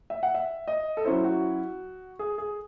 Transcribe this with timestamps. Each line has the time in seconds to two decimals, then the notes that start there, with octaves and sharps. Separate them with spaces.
0.10 E5
0.23 F#5
0.34 E5
0.68 D#5
0.97 A4
1.05 F#3 C#4 E4 C5
1.24 F#4
2.19 G#4
2.38 G#4